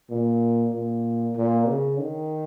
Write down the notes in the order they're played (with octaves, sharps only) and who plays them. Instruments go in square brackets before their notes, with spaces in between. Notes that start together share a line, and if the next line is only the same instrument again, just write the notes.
[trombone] A#2
A#2
A#2
C#3
D#3